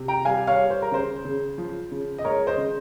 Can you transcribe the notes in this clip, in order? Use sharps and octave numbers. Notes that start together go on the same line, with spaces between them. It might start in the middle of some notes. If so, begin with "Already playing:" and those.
Already playing: C3
G5 A#5
G3 F5 G#5
C#5 F5
G3
C5
A#4
C#3 C5
C#3
F3
C#3
D#5
G#3 A#4 C#5
C5 D#5
C#3